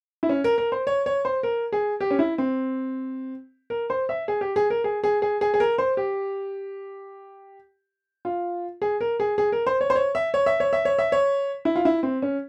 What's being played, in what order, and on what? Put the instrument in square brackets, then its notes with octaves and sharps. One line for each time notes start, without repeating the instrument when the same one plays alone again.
[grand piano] E4
C#4
A#4
A#4
C5
C#5
C#5
C5
A#4
G#4
G4
C#4
E4
C4
A#4
C5
E5
G#4
G4
G#4
A#4
G#4
G#4
G#4
G#4
G#4
A#4
C5
G4
F4
G#4
A#4
G#4
G#4
A#4
C5
C#5
C5
C#5
E5
C#5
E5
C#5
E5
C#5
E5
C#5
E4
F4
E4
C4
C#4